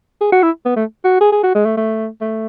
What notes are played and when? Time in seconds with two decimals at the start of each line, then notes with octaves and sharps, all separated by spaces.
0.21 G#4
0.32 F#4
0.43 E4
0.65 B3
0.76 A3
1.04 F#4
1.21 G#4
1.32 G#4
1.43 F#4
1.55 G#3
1.66 A3
1.77 A3
2.21 A3